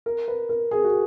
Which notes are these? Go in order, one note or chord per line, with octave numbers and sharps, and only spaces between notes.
A#4
B4
A#4
G#4
F#4